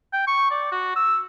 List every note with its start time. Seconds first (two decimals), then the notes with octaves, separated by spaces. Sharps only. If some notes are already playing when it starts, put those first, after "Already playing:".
0.13 G5
0.27 C#6
0.51 D5
0.72 F#4
0.96 E6